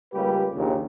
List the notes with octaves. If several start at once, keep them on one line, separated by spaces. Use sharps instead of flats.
C#2 G3 A#3 F4 G4 B4
A#1 D#2 A#2 C#3